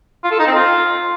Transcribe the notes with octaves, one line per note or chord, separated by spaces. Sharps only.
F4
A4
D#4
C4
F4